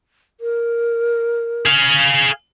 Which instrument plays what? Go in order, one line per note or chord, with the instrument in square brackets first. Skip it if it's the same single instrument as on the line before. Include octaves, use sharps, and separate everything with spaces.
[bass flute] A#4
[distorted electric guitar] G#4 F5